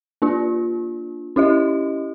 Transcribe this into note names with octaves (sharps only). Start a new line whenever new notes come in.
A#3 D4 F4
C#4 E4 G4 D#5